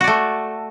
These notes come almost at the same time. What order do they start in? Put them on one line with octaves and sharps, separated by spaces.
F#4 D5 A3